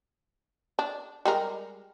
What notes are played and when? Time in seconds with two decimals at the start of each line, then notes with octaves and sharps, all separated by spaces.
0.79 D4
1.25 G3 G#3 A#4